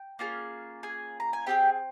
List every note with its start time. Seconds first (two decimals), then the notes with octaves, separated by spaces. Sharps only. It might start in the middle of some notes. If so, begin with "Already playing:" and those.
Already playing: G5
0.19 A#3 C#4 F4 G#4
0.83 G#4 G#5
1.20 A#5
1.33 G#5
1.46 C4 F4 G4 G#4 G5